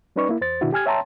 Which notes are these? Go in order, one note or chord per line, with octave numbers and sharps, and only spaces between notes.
G3 C#4 D#4 B4 D5 C#6
A#3 E4
E2 C5 A6
B2 D#3 B3 D4 E4 F#4
G4 G#5 F6 G#6
C#5 E5 G5 A5 A#5 C6